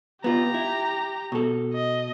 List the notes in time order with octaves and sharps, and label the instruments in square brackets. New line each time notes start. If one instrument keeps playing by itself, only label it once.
[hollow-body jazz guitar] B3 F4 [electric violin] G4 A#5
[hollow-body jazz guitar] E4
B2 A4
[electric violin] D#5